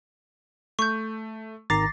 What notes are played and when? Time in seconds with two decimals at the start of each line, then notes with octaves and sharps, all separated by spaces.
0.79 A3 C#6 G6
1.70 G#1 D#3 A#5 D6 A6 A#6 C7